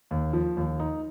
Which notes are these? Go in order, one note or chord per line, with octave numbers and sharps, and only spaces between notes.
D#2
F3
D#2
D#4